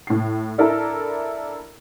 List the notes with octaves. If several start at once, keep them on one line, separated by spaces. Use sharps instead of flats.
A2 C7
D4 E4 A4 A#4